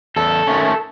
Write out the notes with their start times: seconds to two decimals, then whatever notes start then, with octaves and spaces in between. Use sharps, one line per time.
0.16 E2 A4
0.47 D#3 A3 C#4